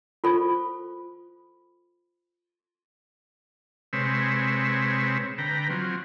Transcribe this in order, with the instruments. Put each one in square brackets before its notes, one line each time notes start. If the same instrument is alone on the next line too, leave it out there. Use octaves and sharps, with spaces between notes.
[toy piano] F4 A4 C5 B5 C#6
[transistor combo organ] C3 G#3 C4 B4 C#5 E6
D3 B4 G5 A#5
F3 F#3 C4